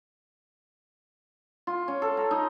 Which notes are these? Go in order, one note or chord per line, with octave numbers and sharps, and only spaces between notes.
F4
C#4
A4
A#5
D#4